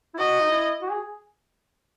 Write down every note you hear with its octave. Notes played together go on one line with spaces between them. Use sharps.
E4
F#4 D#5
D#4
E4
F#4
G#4